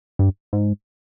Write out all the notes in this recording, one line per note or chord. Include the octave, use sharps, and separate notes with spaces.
G2
G#2